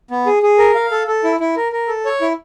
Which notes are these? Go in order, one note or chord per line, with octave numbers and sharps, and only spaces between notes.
B3
G#4
G#4
A#4
F5
A4
A4
E4
E4
A#4
A#4
A4
C#5
E4